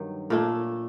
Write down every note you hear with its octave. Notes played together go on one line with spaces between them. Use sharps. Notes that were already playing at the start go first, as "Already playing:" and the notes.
Already playing: G2 D#3 F#3
A#2 A3 D4